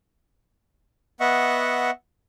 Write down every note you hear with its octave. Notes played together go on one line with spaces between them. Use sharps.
B3 D#5 E5 F#5 C#6